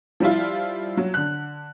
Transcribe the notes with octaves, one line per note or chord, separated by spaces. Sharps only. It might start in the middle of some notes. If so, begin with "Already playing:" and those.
F3 G3 E4 F4
F#3
D3 F#6